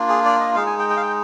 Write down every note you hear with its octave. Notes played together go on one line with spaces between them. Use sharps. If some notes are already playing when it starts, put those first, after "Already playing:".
Already playing: A#3 D4 F4
G#4
D5
D#5
G#3 D#4 F5
G#5
G5
G5
F5
G5